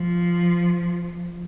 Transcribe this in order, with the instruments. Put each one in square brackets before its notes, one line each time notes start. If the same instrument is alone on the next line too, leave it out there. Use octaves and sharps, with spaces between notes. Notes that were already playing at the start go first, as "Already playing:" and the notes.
Already playing: [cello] F3